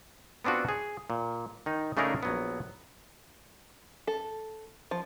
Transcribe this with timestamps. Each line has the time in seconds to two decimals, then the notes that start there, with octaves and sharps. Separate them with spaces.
0.44 B3 C4 D4 F4 F#4
0.69 G#4
1.10 A#2
1.66 D#3 D#4
1.97 C#3 A3 D4 D#4 G#4 A#4
2.23 A#1 F#3 B3
4.07 A4
4.91 F3